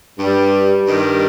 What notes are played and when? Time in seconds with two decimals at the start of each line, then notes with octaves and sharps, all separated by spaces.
0.19 G2 G3
0.87 G2 D#3 G3